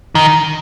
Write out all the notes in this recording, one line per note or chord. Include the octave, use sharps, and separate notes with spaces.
D#3